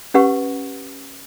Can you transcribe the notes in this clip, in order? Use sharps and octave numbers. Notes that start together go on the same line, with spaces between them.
C#4 G4 B4 F#5 C#6